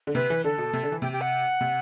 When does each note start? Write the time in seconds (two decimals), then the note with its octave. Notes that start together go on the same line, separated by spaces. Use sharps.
0.07 D3
0.15 C3 B4
0.30 E3
0.44 D3 A4
0.58 B2
0.73 C3
0.83 D3
0.92 E3
1.02 C3 G4
1.12 G4
1.21 F#5
1.61 C3